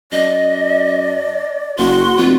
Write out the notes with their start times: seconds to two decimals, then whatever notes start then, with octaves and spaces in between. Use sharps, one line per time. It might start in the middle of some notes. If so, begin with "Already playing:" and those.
0.12 F#2 D5 D#5
1.78 F#1 F#4 C6
2.18 F1 F4